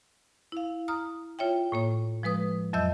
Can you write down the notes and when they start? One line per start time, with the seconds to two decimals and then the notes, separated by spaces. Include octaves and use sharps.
0.52 E4 F5
0.88 A#5 D#6 F6
1.39 F4 C#5 E5 G5
1.72 A2 A#3 C#5
2.23 F3 G#3 B4 D#6
2.73 F2 F#3 D#5 E5 E6 G6